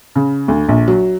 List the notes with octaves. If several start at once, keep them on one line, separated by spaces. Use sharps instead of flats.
C#3
D2
A#1
F#3